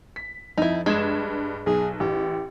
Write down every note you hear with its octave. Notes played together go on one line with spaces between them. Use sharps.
B6
F2 D#4 E4
G2 G#3 G#6 E7
B1 G#4
A1 G4